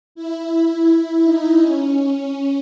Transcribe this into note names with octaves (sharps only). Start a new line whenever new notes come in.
E4
E4
D#4
C#4